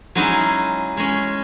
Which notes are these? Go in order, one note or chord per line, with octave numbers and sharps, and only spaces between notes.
F#3 G#3 C#4 D#4 E4 G#4
G#3 C#4